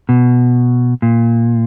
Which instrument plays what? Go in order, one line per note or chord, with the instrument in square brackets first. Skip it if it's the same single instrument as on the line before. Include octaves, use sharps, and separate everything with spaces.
[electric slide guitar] B2
A#2